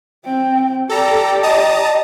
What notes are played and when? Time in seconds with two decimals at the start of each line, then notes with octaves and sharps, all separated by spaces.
0.24 C4 G5
0.89 G4 A4 D5 A#5
1.43 D#5 A5 A#5 D#6